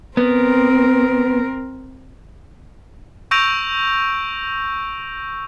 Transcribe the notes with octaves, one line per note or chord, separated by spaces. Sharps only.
B3 C4 A#4
C#6 E6 G6 A#6 D7 F7